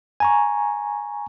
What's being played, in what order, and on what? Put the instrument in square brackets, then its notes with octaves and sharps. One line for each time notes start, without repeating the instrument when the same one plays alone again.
[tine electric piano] G#5 A#5 C#6